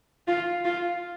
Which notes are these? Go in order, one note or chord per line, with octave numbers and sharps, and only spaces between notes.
F4
F4